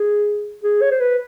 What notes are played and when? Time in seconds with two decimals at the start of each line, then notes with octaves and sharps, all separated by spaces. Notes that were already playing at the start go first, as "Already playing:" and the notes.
Already playing: G#4
0.63 G#4
0.82 C#5
0.91 C5
1.00 B4